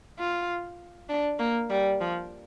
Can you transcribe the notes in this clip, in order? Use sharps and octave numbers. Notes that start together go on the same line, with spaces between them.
F4
D4
A#3
G3
F3